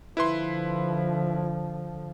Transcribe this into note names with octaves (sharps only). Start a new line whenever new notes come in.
D3 F3 E4 B4 C6